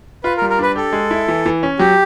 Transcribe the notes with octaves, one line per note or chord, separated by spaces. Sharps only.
F4 B4
A#4
G3
A#4
D4 B4
G4 A4
G#3
E4
E3
E3
C#4
F#3 G4